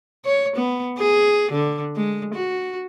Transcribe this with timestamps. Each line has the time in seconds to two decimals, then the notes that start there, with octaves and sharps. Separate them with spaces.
0.25 C#5
0.56 B3
0.98 G#4
1.52 D3
1.96 G#3
2.34 F#4